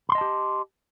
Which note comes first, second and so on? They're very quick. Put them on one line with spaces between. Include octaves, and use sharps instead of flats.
B5 C6 D#5 A5 G4